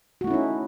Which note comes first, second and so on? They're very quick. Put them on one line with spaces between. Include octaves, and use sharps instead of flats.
F#4 A3 E4 C#4 D#4